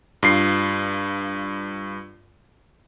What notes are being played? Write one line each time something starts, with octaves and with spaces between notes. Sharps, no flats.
G2 F4 C7